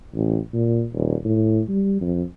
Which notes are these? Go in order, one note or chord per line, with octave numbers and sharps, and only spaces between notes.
A1
A#2
D#1
A2
G3
F2